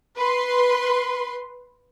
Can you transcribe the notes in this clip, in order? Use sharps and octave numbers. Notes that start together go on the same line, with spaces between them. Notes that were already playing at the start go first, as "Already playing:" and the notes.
B4 C6